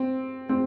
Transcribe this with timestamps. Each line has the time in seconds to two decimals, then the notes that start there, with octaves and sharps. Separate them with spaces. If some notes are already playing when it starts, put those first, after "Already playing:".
Already playing: C4
0.49 C4